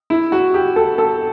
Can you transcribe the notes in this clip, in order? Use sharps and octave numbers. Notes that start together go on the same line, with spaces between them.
E4
F#4
G4
A4
A4